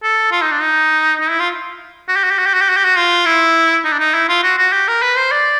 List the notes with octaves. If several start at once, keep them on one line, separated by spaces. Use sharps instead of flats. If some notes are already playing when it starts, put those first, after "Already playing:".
A4
F4
D#4
D4
D#4
D#4
E4
F4
F#4
G4
F#4
G4
F#4
G4
F#4
G4
F#4
G4
F#4
F4
E4
D#4
D4
D#4
E4
F4
F#4
F#4
G4
A#4
B4
C5
D5